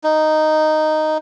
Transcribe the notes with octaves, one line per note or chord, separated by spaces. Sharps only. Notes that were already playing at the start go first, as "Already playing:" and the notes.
D#4